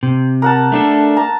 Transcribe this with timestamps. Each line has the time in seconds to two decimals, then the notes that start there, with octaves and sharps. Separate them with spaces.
0.03 C3
0.42 A#4 F#5 A5
0.72 A3 D4 A4
1.17 A5 A#5